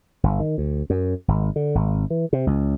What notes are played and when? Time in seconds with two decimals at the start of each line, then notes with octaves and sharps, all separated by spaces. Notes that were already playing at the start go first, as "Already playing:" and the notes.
0.23 G1
0.40 D#3
0.58 D2
0.90 F#2
1.28 G#1
1.56 D3
1.75 G#1
2.10 E3
2.33 C3
2.47 C#2